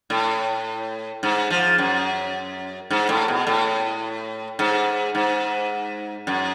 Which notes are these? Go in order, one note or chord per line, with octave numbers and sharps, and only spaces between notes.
A2
G#2
F3
F#2
G#2
A2
B2
A2
G#2
G#2
F#2